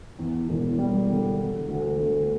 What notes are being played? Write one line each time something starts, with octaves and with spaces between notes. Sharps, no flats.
E2
E1
G3
D3
D3
D2
D2